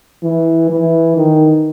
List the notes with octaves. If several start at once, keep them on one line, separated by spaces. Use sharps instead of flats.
E3
E3
D#3